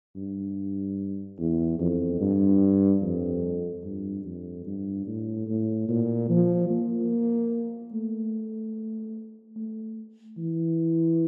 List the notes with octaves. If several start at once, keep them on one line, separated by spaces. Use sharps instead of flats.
G2
E2
F2
G2
F2
G2
F2
G2
A2
A2
A#2
F3
A#3
A3
A3
E3